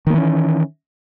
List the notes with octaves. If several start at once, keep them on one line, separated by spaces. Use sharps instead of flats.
D#3 E3 A#3 C#4